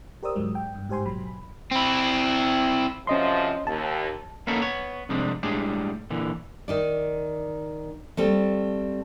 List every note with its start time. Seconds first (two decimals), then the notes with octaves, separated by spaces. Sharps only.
0.23 G4 A#4 C5 D5 D#6 E6
0.36 D2 G#2 F#3 G#3
0.55 G5
0.75 G2
0.89 G#2 G4 C5 G#5 C6
1.05 A1 B2 F#3 B5
1.71 C4 E4
3.07 F#2 C3 F3 C#4 D#5 C6
3.67 D#2 A5
4.47 A#3 B3 C#4 D#4 E4 A4
4.62 B3 C#5
5.09 C2 F2 C3 G3 G#3 D4
5.43 A2 G3 G#3 D4 G#4
6.10 A#2 D3 E3
6.68 D#3 D#4 D5
8.17 G3 A3 C4